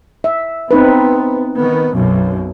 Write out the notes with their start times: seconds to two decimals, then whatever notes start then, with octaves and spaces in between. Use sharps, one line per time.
0.24 E5
0.71 B3 C4 D#4 B4
1.56 D#3 B3
1.94 B1 F#2 B2